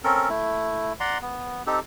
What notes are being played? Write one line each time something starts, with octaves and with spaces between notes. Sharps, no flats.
C4 C#4 A4 A#4
A3 E4
D5 F#5 A#5 C6
B3
C4 D#4 G4 A4